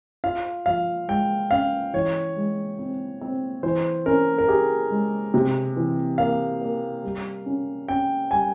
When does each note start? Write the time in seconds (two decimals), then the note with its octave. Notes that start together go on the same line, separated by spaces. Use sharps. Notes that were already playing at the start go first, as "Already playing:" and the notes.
0.24 F4 F5
0.66 F3 F5
1.08 G#3 G5
1.51 C#4 F5
1.93 E3 C#5
2.36 G#3
2.79 C4
3.21 C4
3.63 E3 C5
4.06 C#4 A#4
4.38 A#4
4.48 G4 G#4
4.90 G#3
5.34 C3
5.76 E3
6.18 A#3 F5
6.61 A#3
7.03 G3
7.46 C#4
7.88 C#4 G5
8.31 G3 G#5